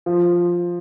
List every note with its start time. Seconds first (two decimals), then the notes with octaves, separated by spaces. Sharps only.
0.06 F3